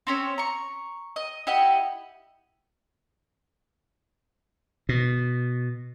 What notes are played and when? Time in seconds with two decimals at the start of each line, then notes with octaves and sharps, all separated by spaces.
0.07 C4 C#4 C#5
0.38 A#5 C#6
1.16 D#5
1.47 E4 G4 D#5 F#5
4.89 B2